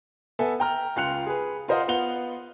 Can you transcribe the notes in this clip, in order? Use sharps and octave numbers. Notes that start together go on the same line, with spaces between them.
B3 A4 E5 G#5
G5 A#5 F6
C#2 F4 G5 F#6 C#7 F7
G#4 B4
F4 A#4 C5 D#5 F5 F#5
B3 F4 F#5 F7 G7